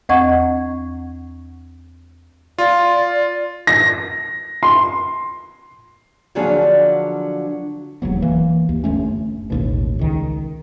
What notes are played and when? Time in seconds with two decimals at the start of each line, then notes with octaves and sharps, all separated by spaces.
0.09 E2 C4 D#5 F#5 C#6 G#6
2.58 F4 D5
3.67 A#6
4.63 C6
6.35 D3 F3 F#3 A#3 D4 G#4
8.02 E1 D#2 F#3 B3
8.22 E3 A#3
8.69 D#2
8.84 G1 F2 A3 C#4
9.50 A1 D#2 B2
9.99 C#2 D#3